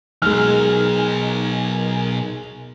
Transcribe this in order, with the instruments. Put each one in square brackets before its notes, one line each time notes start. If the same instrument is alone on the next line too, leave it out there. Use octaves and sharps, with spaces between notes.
[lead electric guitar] B2 F#3 [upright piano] G#3 F6 [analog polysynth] D#4 A#4 G#5